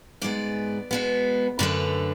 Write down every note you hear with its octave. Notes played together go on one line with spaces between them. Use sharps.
G#2 G#3 B3 D5
B2 G#3 B3
F#2 D3 A3 B4